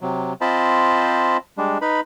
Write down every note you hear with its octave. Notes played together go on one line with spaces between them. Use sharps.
C3 F#3
C4 F4 C5 D#5 A5 B5
G3 G#3 D4
D#4 B4 B5